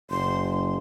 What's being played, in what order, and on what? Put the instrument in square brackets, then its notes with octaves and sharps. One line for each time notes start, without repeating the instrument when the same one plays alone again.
[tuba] F#1 [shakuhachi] C6